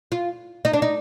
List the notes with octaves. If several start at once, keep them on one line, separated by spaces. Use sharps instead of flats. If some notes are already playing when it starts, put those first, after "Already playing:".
F4
D#4
D4
D#4